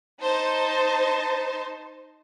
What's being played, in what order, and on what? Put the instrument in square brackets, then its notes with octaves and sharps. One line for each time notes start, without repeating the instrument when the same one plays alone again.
[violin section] D#4 C5 A5